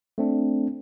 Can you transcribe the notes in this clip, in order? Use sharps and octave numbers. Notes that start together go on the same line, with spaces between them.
A3 C4 D4